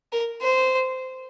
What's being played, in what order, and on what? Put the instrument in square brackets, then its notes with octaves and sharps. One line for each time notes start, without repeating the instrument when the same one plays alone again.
[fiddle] A#4
C5